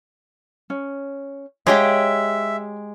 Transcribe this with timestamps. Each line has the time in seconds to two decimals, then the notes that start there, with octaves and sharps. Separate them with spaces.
0.70 C#4
1.67 G#3 G4 C#5 E5 F5 G5 G#5